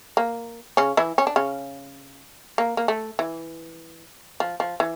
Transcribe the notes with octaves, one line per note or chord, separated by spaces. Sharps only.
A#3
C#3 C#4
E3 E4
C#4
D4
C#3 C#4
A#3
A#3
A3
E3
F3
F3
E3